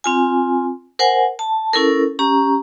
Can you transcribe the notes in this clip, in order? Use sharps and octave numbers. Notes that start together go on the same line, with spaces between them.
C4 F4 G#5
A#4 C5 F#5 G#5
A5
C#4 E4 A4 A#4
C#4 G4 A#5